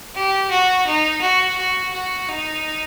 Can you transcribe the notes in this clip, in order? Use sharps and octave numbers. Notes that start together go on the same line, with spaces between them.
G4
F#4
D#4
F#4
F#4
F#4
D#4